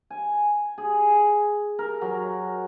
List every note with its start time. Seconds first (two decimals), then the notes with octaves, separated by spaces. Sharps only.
0.10 G#5
0.78 G#4
1.79 A#4
2.01 F#3